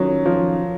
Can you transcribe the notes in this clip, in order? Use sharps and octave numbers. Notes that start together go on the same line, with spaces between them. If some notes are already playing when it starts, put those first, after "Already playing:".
Already playing: D#3 F#3 C#4 F4
F3